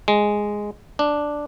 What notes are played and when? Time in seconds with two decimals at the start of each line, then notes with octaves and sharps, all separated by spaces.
0.08 G#3
0.99 D4